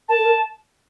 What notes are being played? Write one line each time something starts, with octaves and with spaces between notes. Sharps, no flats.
A#4 A5
A4
A#4